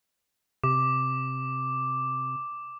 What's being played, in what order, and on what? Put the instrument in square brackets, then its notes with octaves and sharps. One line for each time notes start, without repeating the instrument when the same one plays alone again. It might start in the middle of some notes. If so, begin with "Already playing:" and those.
[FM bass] C3 [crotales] D6